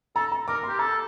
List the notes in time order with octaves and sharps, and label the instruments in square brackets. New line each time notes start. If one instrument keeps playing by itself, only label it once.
[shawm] A4 [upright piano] A#5
[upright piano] A#5
[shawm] A#4 [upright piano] D6
[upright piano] C6
[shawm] G4
[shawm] A4 [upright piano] A#5